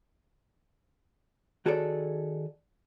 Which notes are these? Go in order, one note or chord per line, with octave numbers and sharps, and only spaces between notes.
D#3 F#4 G#4 A4 C#5 D5